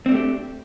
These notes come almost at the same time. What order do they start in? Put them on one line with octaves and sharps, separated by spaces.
C4 D4 A3 G4